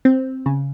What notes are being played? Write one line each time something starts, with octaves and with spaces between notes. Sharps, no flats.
C4
C#3